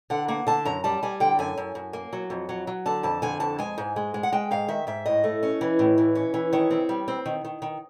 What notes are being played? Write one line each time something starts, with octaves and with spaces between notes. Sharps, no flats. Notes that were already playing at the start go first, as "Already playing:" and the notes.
D3 F#5
A#3 F#5
D3 A5
F#2 A#5
G3 A5
G3 G#5
D3 G5
F#2 G#5
F#2
F#2
A#3
F#3
F2
F#3
F#3
D3 A5
F2 A5
D3 G#5
F2 A5
G#3 G#5
G#2
G#3
G#3
F#5
G#3 G5
G#2 F5
D#3 E5
G#2 E5
A2 D#5
A3
C#4
E3
A2
E3
C#4
E3
D#3 C#5
C4
G3
C4
D#3
D#3
D#3